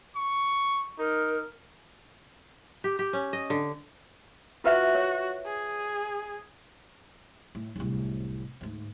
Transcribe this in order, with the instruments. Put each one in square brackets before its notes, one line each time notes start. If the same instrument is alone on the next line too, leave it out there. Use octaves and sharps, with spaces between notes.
[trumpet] C#6
[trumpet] D#4 [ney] A#4
[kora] G4
G4
C#4
D#5
D3
[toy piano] F4 B4 E5 [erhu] F#4
[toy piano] C#5
[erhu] G#4
[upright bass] A2
D1 C2
D2 G#2